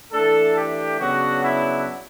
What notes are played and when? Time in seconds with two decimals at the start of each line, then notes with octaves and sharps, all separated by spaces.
0.13 E3 A3 D4 A4
0.57 G4
1.00 C#3 F#3 B3 D4 F#4
1.44 E4